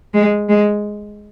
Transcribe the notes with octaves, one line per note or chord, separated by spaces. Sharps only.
G#3
G#3